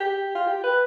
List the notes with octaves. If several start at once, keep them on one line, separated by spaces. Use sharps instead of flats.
G4
F4
G4
B4